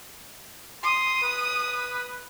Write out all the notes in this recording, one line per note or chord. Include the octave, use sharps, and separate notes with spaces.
C6 D#6
B4